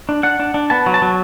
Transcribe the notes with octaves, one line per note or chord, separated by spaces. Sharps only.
D4
D4 F#5
D4
D4
B3 A5
F#3
A5
F#3